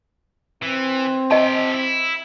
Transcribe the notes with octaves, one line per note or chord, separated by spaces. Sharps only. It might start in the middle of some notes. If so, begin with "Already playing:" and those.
E3 C4
G4 A4 D#5 A5
E4